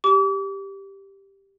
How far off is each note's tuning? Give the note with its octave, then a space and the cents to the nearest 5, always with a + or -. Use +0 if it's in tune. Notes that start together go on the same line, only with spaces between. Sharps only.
G4 +0 D6 -40